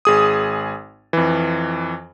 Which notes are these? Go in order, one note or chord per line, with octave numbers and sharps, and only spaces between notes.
G#1 G#4 D#6
F2 E3